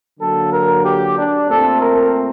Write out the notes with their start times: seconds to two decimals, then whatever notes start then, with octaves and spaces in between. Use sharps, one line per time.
0.19 D3 F#3 A#3 A4
0.52 A#4
0.84 G4
1.16 D4
1.48 A#2 A3 C4 A4
1.81 A#4